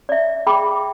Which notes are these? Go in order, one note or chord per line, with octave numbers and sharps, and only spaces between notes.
D5 E5
G#4 G5 B5 D6